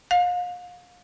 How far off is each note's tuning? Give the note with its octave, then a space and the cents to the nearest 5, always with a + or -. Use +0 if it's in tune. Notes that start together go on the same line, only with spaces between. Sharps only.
F5 +35